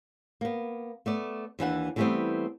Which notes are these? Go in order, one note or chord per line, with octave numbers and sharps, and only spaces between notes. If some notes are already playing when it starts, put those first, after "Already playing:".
A#3 B3
A3 B3 D5
D#2 E3 D4 F#5
D3 E3 G3 A3 B3 C4